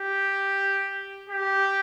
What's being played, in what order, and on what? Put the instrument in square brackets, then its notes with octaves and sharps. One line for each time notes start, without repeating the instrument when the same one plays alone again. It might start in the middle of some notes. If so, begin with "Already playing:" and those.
Already playing: [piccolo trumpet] G4
G4